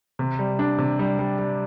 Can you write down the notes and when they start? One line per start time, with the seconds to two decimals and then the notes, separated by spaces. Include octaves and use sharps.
0.19 C3
0.39 G3
0.59 D4
0.78 C3
0.99 G3
1.19 G3
1.39 G3